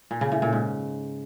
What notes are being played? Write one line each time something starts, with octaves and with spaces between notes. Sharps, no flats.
A#2
C#3
A2
A#2
G#2